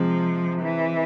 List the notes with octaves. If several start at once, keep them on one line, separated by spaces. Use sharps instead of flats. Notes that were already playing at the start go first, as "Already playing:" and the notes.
Already playing: C3 F3 G#3 C4
E3